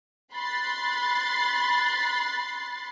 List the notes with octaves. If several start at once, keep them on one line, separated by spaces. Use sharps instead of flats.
B5 C6 F#6 A6 C7